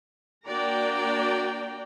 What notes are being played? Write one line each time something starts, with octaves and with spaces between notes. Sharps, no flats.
A#3 D4 F#4 D5 G5 A#5